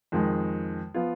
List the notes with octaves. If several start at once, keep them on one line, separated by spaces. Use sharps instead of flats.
F2 D#3 G#3
F3 B3 F4